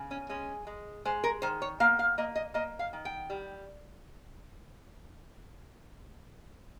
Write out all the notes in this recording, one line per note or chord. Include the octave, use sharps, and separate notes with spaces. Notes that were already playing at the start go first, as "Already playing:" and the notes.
Already playing: C#3
C#4
G#3 C#4
G#3
G#3 C5
A#4
D#3 C5
C#5
A#3 F5
F5
A#3 D#5
D#5
A#3 D#5
F5
D#3
G5
G3